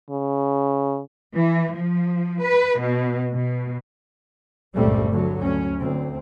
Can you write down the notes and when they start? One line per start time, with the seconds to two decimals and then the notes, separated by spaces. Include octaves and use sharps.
0.10 C#3
1.35 E3
1.75 F3
2.43 B4
2.78 B2
3.34 B2
4.74 G1 C#2 A#2 G3 A3 C4
5.09 D2 D3 F#3
5.39 D2 C#4
5.79 D2 C4